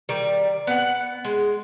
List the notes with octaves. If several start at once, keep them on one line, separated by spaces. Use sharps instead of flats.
D#3 G3
B3 F#5
G#3